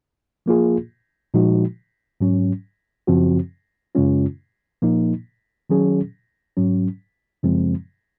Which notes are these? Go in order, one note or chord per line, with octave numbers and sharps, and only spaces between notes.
F3 A#3 F4 G#4
A#2 F3 G#3 D#4 F#4
G#2 F#3 C#4
F#2 C#3 F3 C4 F#4
F#2 C#3 G#3 C#4 F4
A#2 F3 A#3 D#4
D#3 F#3 C#4 G#4
G#2 F#3 C#4
F#2 C#3 F3 G#3 C4